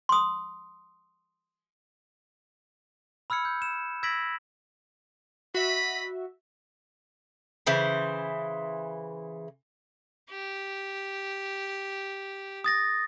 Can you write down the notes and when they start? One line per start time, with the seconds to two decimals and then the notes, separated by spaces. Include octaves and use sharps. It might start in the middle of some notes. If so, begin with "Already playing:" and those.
0.09 C6 D#6
3.30 B5 E6 F6 G#6 C#7
3.45 G6
3.62 E7
4.03 E6 G#6 A#6 B6 D7 F#7
5.55 F#4 D#5 E5 B5
7.67 C#3 E3 C5
10.31 G4
12.64 D#6 A6 A#6